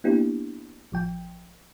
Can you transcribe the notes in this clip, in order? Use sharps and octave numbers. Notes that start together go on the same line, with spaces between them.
A#3 B3 D4 E4 G4
A1 F3 G5